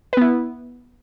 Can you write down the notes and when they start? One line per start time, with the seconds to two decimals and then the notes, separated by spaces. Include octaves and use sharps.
0.13 B4
0.17 B3
0.21 E4